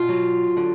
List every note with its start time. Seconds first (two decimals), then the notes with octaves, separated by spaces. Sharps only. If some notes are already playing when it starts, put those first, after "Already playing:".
Already playing: B2 F4
0.09 F#3
0.57 D3